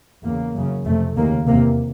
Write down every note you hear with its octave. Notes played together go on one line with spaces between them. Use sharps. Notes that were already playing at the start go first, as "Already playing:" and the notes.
E2 C#3 A#3
F#2 C#3
F2 C3 A3
D#2 C#3 A#3
E2 C3 A#3